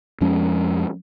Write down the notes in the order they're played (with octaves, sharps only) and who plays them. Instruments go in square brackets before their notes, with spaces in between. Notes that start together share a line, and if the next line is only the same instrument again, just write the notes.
[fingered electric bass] F2 F3 G#3 C#4